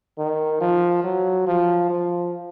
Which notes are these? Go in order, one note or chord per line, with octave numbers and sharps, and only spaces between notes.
D#3
F3
F#3
F3
F3